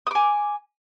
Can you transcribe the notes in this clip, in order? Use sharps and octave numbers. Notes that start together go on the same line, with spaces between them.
G#5 D6 D#6